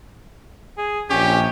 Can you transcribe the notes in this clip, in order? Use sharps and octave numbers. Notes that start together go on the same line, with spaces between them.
G#4
A#1 C#4 G4